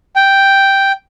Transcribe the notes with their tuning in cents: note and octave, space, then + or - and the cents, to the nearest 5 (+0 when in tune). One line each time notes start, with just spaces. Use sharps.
G5 +0